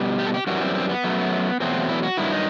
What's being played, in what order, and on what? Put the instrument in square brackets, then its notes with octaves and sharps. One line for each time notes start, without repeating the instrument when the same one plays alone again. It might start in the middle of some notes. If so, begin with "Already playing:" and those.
Already playing: [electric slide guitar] B2 G3
G4
A4
G4
F#2 E3 G3 F#4
C4
C4
B3
F#2 F#3 A3
E2 B2 F#3 A3 C4
E4
F#4
G2 D#3 F#3 E4
D#4